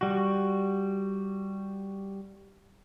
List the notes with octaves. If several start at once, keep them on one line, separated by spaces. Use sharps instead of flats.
G3 F#4